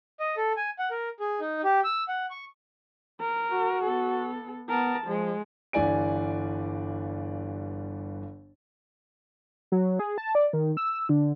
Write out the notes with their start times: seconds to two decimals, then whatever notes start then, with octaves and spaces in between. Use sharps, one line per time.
0.20 D#5
0.37 A4
0.57 G#5
0.79 F#5
0.91 A#4
1.20 G#4
1.40 D#4
1.64 G4
1.84 E6
2.08 F#5
2.30 C#6
3.21 A#4
3.52 F#4
3.84 B3 A4
4.69 B3 A#4 A5
5.07 F3 G#3
5.73 G1 G2 E3 D5 G#5 D7
9.72 F#3
9.99 G#4
10.18 A5
10.35 D5
10.53 D#3
10.77 E6
11.09 D3